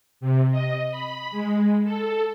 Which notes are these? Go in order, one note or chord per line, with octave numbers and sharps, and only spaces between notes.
C3
D#5
B5
G#3
A4